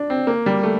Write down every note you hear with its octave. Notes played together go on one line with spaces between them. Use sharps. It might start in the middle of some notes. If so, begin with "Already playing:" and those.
Already playing: D4
C4
A#3
G3
A3